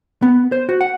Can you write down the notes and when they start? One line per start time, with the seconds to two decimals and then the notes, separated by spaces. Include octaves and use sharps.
0.22 B3
0.52 C5
0.69 F#4
0.81 F#5